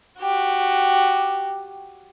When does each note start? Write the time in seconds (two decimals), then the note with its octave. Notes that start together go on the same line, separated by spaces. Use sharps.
0.20 F#4 G4